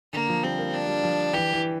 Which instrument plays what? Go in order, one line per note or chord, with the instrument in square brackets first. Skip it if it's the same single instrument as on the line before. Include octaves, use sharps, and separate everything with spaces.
[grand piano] D3 [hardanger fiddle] A#3
[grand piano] F3
[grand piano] G3 [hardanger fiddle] C4
[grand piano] A#3
[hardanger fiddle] D4
[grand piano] G3
F3
[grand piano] E3 [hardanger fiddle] G4
[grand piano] E3